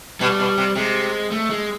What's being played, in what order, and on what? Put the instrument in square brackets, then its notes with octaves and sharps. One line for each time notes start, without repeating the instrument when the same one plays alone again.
[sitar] B2 [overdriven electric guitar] G3
[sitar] B2
C3
[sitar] C3 [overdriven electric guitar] G#3
[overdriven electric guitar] A3
G#3